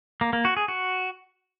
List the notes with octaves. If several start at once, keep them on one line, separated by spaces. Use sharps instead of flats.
A#3
A#3
F#4
G#4
F#4